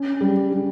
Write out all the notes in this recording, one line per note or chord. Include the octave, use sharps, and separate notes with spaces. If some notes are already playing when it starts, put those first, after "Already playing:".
Already playing: C#4
G3
G3